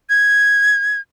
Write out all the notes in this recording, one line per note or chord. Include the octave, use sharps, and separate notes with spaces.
G#6